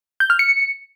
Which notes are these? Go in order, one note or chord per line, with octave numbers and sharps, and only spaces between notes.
G6
F6
C#7